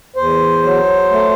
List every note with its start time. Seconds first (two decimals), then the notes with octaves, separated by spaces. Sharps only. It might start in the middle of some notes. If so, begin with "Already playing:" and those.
0.16 E2 C5
0.63 F#3
1.11 A3